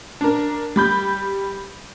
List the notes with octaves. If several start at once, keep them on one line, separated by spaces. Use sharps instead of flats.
D4 A#4
G3 B5 G6